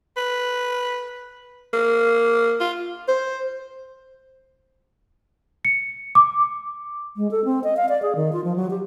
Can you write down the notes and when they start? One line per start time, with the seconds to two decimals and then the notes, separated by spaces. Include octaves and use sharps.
0.17 B4
1.74 A#3
2.60 F4
3.08 C5
5.65 C#7
6.15 D6
7.17 G#3
7.31 A4
7.45 C4
7.64 D#5
7.77 F5
7.89 D5
8.02 G#4
8.16 D#3
8.33 F4
8.44 F3
8.56 F#3
8.70 G4